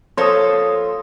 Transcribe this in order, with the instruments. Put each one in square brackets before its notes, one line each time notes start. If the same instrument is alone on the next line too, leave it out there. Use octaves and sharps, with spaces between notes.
[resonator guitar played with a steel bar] F3 A#3 A4 [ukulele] C5 C#5 [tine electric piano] C6 D#6